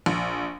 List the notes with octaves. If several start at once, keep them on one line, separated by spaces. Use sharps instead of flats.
A#1